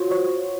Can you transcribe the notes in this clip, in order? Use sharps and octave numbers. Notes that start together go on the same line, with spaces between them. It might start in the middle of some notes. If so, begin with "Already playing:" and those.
Already playing: F4 F#4 C5 C#5
C#5